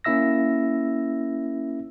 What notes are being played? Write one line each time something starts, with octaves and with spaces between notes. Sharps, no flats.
A#3 C#4 E4 E5 E6 A#6